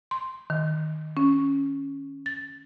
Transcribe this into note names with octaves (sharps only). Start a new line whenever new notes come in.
C6
D#3
C#4
A6